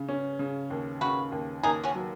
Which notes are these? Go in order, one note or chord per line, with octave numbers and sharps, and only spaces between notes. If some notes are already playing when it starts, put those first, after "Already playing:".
Already playing: C#3
C#4
C#3
D#2
C#3 F#4 B4
D#2
D#2 D#4 G#4
C#4 F#4
F#3